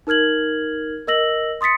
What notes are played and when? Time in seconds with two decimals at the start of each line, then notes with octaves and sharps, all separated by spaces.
0.07 D#4 A#4 F6 G#6 F#7
1.07 A#4 D#5 E6 A#6 F#7
1.61 C6 D#6 A6 B6 C#7